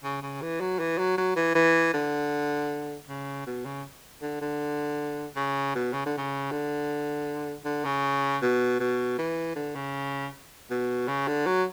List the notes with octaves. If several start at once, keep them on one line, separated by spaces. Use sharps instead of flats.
C#3
C#3
E3
F#3
E3
F#3
F#3
E3
E3
D3
C#3
B2
C#3
D3
D3
C#3
B2
C#3
D3
C#3
D3
D3
C#3
B2
B2
E3
D3
C#3
B2
C#3
D3
F#3